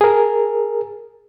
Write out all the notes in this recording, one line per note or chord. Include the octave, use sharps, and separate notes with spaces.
G#4 A#4